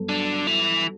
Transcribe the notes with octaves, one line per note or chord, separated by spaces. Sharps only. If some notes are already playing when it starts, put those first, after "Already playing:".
Already playing: G2 F#3 B3 F#4 A4
D3
E3